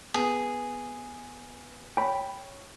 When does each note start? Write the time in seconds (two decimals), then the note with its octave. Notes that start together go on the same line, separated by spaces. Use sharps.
0.14 B3 G#4
1.97 C#5 G5 B5